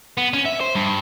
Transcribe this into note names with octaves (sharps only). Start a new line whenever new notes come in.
B3
C#4
E5
C5
G2